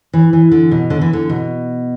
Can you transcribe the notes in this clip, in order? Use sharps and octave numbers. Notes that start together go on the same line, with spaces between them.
E3
E3
D3
B2
D3
E3
D3
B2